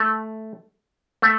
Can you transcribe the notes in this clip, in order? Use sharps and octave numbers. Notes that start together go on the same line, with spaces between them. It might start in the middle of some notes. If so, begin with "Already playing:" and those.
Already playing: A3
A3